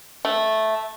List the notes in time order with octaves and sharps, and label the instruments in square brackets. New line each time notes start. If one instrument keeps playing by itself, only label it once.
[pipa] A3